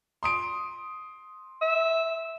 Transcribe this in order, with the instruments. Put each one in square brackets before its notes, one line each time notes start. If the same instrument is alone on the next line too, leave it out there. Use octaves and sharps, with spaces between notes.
[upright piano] C6 D#6 D7
[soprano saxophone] E5